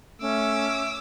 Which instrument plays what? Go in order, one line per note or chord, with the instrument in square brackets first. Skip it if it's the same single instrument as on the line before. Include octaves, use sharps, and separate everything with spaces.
[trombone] A3 [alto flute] C#4 [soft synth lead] E5 [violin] D6 E6